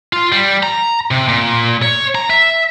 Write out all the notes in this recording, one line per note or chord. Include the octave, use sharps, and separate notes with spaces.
F4
G3
A#5
C3
A#2
C#5
A#5
E5